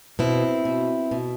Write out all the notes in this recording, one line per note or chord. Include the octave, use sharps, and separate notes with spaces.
B2 C4 E4
B2
B2